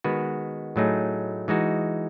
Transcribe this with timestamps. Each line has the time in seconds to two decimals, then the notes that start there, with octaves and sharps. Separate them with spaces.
0.04 D#3 G#3 B3 F#4 B4
0.76 A2 F#3 A3 D#4 G#4
1.48 E3 G#3 D#4 F#4